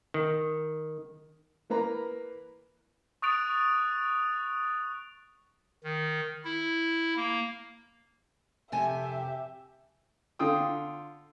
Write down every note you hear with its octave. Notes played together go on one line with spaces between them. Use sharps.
D#3
E3 A#3 B4 A#5
C#6 D#6 F#6 A6 D7 F7
D#3
E4
A#3
F2 C3 G4 E5 G#5
D3 F4 G5 D#6